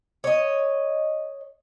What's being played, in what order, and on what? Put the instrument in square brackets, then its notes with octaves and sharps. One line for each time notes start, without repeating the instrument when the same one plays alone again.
[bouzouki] C#5 D#5